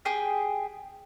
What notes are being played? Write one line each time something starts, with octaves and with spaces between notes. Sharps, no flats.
G4 G#4 G5